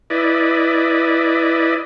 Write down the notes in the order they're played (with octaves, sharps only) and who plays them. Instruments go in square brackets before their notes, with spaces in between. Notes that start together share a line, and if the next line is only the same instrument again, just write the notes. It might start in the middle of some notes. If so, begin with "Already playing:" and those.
[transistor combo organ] E4 B4 D5 D#5